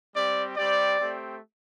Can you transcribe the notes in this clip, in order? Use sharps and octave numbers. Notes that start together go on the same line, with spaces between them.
G3 C4 G4 D5
G3 C4 G4 D5
A3 C4 G4